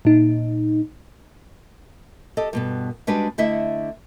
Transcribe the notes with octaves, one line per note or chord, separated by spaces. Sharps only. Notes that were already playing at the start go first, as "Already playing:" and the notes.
A#2 D#4
G4 A4 D#5
G2 B2 B3
G3 G#3 D4 F#4 G4 B4
D3 A3 E4 D#5 E5